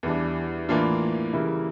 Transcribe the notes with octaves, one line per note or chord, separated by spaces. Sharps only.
E2 E3 G3 D4
A2 E3 A#3 D4 F4
C#3 E3 G3 A#3 E4